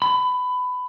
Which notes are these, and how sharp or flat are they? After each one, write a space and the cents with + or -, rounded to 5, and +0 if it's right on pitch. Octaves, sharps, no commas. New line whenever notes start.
B5 +20